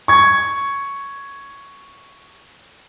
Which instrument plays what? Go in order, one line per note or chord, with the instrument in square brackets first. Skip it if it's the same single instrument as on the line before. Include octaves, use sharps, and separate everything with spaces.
[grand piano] C#6 G#6